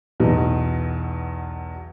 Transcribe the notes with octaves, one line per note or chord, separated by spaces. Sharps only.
B1 E2 B2